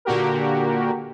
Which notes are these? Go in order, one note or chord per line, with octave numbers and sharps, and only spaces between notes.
A#2 D3 A#3 F#4 G4 A#4